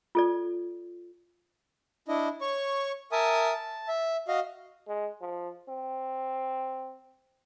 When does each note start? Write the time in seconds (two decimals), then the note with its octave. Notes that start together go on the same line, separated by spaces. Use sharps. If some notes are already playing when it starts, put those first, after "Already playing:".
0.15 F4 A4 D5
2.08 D4 E4 D#5
2.41 C#5 C#6
3.12 A#4 E5 G#5 A5 D#6
3.53 A5
3.88 E5
4.28 F#4 D#5 F5
4.88 G#3
5.21 F3
5.69 C4